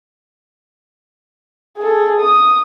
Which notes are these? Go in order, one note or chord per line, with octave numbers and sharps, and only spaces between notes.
G#4 A4
D#6